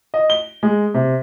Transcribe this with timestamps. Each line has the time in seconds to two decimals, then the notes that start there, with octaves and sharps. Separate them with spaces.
0.14 D#5
0.30 G7
0.63 G#3
0.94 C3